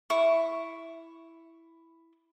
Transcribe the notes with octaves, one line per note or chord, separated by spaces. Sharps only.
E4 C#6